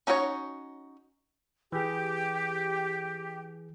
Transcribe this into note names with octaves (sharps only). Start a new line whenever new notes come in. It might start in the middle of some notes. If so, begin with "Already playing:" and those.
C#4 D#4 F#4 A4 C#5
E3 G4 G#4